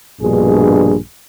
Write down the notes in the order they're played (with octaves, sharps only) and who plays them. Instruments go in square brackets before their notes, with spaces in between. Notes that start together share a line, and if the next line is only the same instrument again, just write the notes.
[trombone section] A#1 G2 B2 G#4